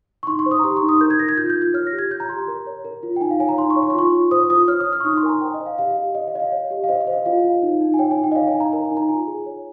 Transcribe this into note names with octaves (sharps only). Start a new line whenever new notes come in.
C#6
D#4 C6
C#6
C5
D#6
A#5
G4 C6
C#6
D#4
D#6
A#4 G6
G#6
A#4 A#6
G#6
F4 G6
G6
F4
G6
C#5 F6
A#6
G4
G#6
C#5 G6
A#5
G4 C6
A#5
A#4
C#5
A#4
F4
G5
D#4 G#5
F5
C#5 G#5
A#5
D#4 C6
C#6
C#5
C#6
C6
F4 C#6
F4
C5 D#6
F4 D#6
C#5 F6
D#6
C#5
F6
C#6
D#4 D#6
C6
A#4 G#5
A#5
C5 G5
D#5
C5
F5
G4 F5
G4
C#5 D#5
F5
C#5 D#5
F5
C#5
G4
F5
C5 D#5
F5
C5
D#5
F4 F5
F4
D#4
D#4
G#5
C#5 G5
G#5
D#4
G5
D#5
C#5 F5
G#5
D#4
A#5
G#5
A#4 A#5
G#5
D#4
A#5
F4 G#5
G#4
C#5